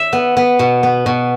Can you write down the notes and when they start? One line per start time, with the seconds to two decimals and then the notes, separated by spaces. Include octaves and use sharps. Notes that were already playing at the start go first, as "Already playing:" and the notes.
Already playing: E5
0.13 B3
0.37 B3
0.59 B2
0.83 B3
1.06 B2